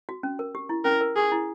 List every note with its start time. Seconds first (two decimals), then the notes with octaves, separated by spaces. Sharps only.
0.09 F#4
0.23 C#4
0.39 A#4
0.55 G4
0.69 E4
0.85 C#4 A#4
1.01 A#4
1.16 G4 G#4
1.32 E4